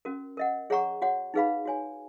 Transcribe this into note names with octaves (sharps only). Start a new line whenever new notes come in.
C#4 F#4 A#4
A#4 D#5 F#5
G#4 C#5 F#5 A#5 C#6
F#4 C#5 F#5
D#4 G#4 B4 F5 B5
F#4 C#5 G#5